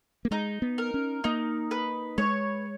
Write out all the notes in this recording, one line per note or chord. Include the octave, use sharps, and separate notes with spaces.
A#3
G#3 D#4
B3
A#4
C#4
A#3 D#4
B4
G#3 C#5